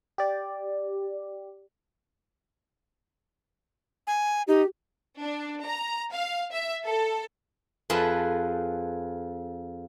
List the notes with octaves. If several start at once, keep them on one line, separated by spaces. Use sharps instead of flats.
G4 D5
G#5
D#4 G4
D4
A#5
F5
E5
A4
F2 F3 G#4 B4 A5